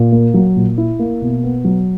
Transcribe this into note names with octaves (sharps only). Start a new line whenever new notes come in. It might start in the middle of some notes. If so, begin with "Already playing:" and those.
Already playing: A#2
A#3
F#3
A#2
E4
A#3
B2
B3
F#3